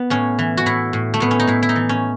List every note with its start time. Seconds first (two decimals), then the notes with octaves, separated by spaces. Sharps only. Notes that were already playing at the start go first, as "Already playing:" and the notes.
Already playing: B3
0.10 A2 C#4
0.39 E3
0.57 F#4
0.66 A2 E4
0.93 A2
1.14 A3
1.20 A2 B3
1.31 C#4
1.40 D#4
1.47 A2 E4
1.63 E4
1.69 D#4
1.76 E3
1.89 C#4